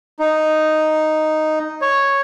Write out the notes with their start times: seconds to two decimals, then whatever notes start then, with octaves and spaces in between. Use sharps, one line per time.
0.19 D#4
1.81 C#5